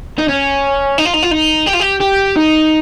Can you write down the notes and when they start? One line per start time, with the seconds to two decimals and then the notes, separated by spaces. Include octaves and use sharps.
0.18 D#4
0.28 C#4
0.98 D#4
1.05 F4
1.14 D#4
1.22 F4
1.31 D#4
1.67 G4
1.75 F4
1.81 G4
2.01 G4
2.36 D#4